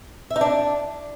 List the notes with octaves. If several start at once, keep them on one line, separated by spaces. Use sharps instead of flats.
E5
D#4
D4